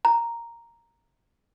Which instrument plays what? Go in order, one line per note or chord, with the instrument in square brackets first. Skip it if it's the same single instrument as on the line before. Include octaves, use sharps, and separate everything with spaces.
[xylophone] A#5